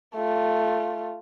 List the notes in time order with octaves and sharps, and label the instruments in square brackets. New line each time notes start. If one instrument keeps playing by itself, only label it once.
[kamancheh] A3 F4